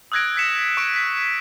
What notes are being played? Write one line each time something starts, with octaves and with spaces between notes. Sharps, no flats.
D#6 E6 F#6 G#6 A#6 D7
G#6 B6 C#7 E7
C#6 D7 E7
B6